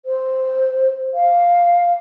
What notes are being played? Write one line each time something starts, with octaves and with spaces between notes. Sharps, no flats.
C5
F5